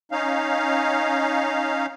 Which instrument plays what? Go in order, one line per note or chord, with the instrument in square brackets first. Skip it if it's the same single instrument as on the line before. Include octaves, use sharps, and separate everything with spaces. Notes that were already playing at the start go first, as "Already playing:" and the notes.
[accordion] C#4 D#4 F5